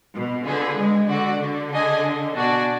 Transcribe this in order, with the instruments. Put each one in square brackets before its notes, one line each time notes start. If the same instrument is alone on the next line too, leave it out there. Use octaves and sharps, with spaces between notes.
[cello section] B2
[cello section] D3 [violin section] F4 G#4 B4
[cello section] G#3
[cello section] D3 [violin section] F#4 D5 F#5
[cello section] D3
[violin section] D4 G#4 D#5 G#5
[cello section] B2 [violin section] D4 F#4 D5 G#5